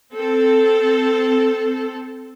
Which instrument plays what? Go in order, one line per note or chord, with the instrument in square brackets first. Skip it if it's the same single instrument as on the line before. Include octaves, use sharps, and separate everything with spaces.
[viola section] C4 A4